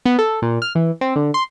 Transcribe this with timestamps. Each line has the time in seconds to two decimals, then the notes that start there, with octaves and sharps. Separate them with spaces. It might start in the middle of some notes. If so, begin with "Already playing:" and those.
0.06 B3
0.19 A4
0.42 A#2
0.62 F6
0.75 E3
1.01 C4
1.16 D3
1.34 C6